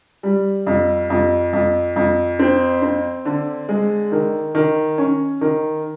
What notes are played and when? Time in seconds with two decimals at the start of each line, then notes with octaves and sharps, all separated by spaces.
0.23 G3
0.67 F2
1.10 F2
1.53 F2
1.96 F2
2.39 C4
2.82 C4
3.25 D3
3.69 G#3
4.12 D#3
4.55 D#3
4.98 C#4
5.41 D#3